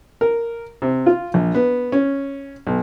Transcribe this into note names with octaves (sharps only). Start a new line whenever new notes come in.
A#4
C3
F4
A#1
B3
C#4
B1